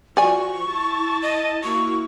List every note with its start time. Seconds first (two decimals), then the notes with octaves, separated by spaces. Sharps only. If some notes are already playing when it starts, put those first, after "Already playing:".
0.17 F3 F#4 D5 G#5 C#6
0.68 E4 A5
1.22 D#5
1.63 A#3 E4 F#4 C#6